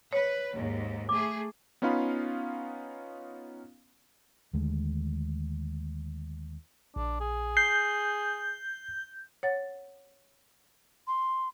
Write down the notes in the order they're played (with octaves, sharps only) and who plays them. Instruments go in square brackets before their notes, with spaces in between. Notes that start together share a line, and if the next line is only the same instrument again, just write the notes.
[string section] B4 [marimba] C#5
[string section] D#2 G#2
[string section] A3 G#4 [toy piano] D6
[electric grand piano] B3 C#4 D#4 F4 F5 B5
[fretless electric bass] D#2 D3 G#3 A3
[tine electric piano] A#1 [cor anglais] D4
[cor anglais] G#4
[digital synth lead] G6 [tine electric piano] C7
[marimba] C#5 F#5 A6
[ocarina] C6